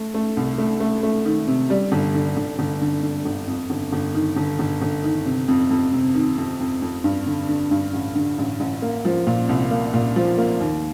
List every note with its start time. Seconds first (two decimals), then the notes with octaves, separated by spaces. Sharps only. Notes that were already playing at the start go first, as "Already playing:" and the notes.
Already playing: A3
0.14 A3
0.37 C2
0.58 A3
0.80 A3
1.03 A3
1.25 D#3
1.48 C3
1.70 G3
1.92 G1
2.14 D3
2.37 G1
2.59 G1
2.81 D3
3.03 D3
3.25 G1
3.47 F2
3.70 G1
3.92 G1
4.14 D#3
4.36 G1
4.59 G1
4.82 G1
5.04 D#3
5.26 C3
5.48 F2
5.70 F2
5.93 C3
6.15 D#3
6.38 F2
6.60 F2
6.82 F2
7.04 G2
7.26 D3
7.49 D3
7.71 G2
7.93 A1
8.15 D3
8.38 A1
8.60 A1
8.82 A#3
9.05 F3
9.27 A#2
9.49 C2
9.71 A#3
9.94 A#2
10.16 F3
10.38 A#3
10.60 D#2